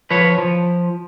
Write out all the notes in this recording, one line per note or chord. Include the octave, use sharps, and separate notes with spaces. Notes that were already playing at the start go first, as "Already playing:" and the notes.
F3 B4 C#5
F3